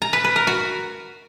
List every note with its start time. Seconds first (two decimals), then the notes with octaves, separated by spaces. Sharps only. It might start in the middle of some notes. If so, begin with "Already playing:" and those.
0.02 A#5
0.13 B4
0.24 B4
0.36 A#4
0.47 F#4